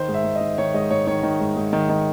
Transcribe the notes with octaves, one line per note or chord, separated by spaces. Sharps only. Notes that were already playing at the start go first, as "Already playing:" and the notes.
Already playing: D#3 C5
G#2
E5
G#2
D#5
D#3
D#3 C#5
G#2 D#5
G#2 C#5
D#3 C#5
D#3
G#2
G#2
D#3
D#3